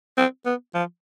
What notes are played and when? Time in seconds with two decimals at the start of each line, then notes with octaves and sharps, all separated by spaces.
0.18 C4
0.46 B3
0.75 F3